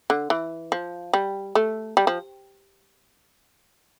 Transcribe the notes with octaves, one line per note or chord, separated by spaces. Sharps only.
D3
E3
F3
G3
A3
G3
F3